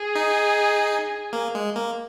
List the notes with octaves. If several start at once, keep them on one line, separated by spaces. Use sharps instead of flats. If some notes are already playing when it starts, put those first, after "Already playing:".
Already playing: G#4
D#4
A#3
G#3
A#3